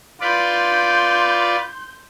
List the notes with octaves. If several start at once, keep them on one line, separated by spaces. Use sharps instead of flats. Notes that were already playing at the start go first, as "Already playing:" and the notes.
F4 B4 D5 C6 G6